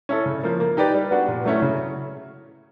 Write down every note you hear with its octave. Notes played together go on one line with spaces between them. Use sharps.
C#4 E4 A4
C#3
F3 A#3
A#3
D#4 G4 B4 D5
G3
B3 D4 F#4
A#2
F#3 A3 C#4 E4
C#3